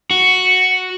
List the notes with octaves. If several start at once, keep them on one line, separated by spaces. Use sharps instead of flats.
F#4